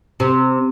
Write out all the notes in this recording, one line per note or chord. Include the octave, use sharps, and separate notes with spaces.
C3